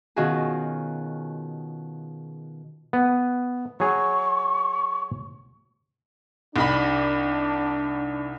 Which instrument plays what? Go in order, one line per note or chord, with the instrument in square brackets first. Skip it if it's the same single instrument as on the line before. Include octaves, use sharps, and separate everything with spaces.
[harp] B2 D#3 C#4 F4 F#4 G#4
[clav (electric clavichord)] B3
[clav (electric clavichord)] F#3 G#4 [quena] C#6
[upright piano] C2 D#4 B5 [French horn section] D4